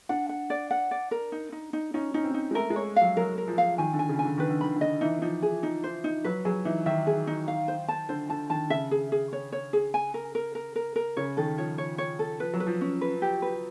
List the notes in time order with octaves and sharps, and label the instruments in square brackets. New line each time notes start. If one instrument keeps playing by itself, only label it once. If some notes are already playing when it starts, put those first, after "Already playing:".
[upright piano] D4 [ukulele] F#5
[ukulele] F#5
D5
F#5
D5
A#4
D#4
D#4
D#4
[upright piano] C#4 [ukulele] D#4
[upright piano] C#4 [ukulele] D#4
[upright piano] C4
[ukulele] D#4
[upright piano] G#3
[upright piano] A3 [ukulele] A#4
[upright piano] G#3
[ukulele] C#5
[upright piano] F#3 [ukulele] F5
[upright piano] F#3 [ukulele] A#4
[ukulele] A#4
[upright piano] F3
[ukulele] F5
[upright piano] D#3 [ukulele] G#5
[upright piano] D3
[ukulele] G#5
[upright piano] C#3
[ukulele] G#5
[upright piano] D3
[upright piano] D#3 [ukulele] B4
[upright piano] D3
[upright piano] D#3 [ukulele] B5
[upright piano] D3
[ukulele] D#5
[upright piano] E3 [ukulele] D#4
[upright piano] F3 [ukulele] D#4
[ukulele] G#4
D#4
C5
D#4
[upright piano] F#3 [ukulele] B4
[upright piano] F#3 [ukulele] G#4
[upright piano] E3 [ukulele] D#4
[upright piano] D#3 [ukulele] E5
[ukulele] G#4
D#4
F5
C5
A5
[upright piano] D3 [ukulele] C5
[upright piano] D3 [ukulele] A5
[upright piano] D#3 [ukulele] A5
[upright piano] C#3 [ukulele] E5
[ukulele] G#4
G#4
C#5
C#5
G#4
G#5
A#4
A#4
A#4
A#4
A#4
[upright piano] C#3 [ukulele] C#5
[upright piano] D#3 [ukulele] A4
[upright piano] F3 [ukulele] C#5
[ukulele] C#5
C#5
A4
[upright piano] F3 [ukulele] B4
[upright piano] F#3
[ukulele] B4
[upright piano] F3
[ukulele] C#4
B4
G4
B4